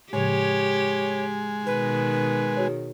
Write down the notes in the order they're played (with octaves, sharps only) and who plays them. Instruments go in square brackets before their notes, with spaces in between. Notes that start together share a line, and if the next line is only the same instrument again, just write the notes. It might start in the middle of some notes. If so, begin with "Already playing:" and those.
[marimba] A2 C#3 F3 [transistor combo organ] G#3 [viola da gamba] G4 [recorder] C#5
[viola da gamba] B2 D#3 [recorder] B4
[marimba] F#4 G#4 C#5